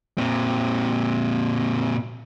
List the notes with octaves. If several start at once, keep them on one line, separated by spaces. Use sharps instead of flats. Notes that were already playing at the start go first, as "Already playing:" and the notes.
A#2 C4